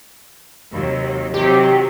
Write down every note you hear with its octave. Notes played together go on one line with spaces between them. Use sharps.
D#2 C3 F#3
C3 D#3 F#3 G4